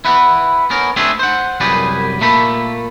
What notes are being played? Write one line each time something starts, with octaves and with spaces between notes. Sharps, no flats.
E4 B4 F#5
B3 C#4 A#4
A3 C4 D4 G#4 A4 E5
C5 F#5
C2 F#2 G3 G#4 B4 D5
A#2 A3 A#3 A4 B5